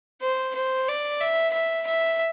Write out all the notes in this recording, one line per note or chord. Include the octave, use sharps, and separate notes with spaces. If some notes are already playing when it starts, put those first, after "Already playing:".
C5
C5
D5
E5
E5
E5